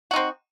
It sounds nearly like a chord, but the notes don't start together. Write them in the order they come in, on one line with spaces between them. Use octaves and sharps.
F#4 D#4 C4